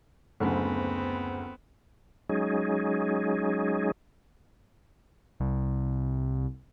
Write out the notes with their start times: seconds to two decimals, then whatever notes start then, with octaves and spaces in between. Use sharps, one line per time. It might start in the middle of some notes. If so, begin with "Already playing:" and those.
0.40 F#1 D2 B3 C4
2.29 F#3 G#3 C#4 D#4 G#4
5.40 C2